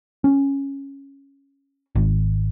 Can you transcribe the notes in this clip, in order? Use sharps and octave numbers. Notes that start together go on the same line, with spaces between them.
C#4
G#1